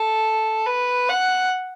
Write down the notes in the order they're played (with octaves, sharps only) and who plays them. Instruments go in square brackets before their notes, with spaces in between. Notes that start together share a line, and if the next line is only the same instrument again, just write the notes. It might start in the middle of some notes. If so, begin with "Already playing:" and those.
Already playing: [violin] A4
B4
F#5